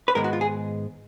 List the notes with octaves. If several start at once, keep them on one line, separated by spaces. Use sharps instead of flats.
B4
G#2 D#3 G#3 B3 A#4
F#4
F4
G#4